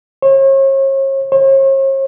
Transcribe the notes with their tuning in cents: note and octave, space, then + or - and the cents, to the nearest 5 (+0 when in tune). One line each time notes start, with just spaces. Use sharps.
C#5 -40
C#5 -45